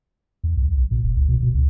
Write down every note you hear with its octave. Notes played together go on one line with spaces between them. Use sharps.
E2
C2
A#1
A#2
F1
C#2
B2
B2
C#2